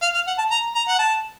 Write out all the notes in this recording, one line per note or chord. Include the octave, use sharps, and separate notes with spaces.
F5
F5
F#5
A5
A#5
A#5
F#5
A5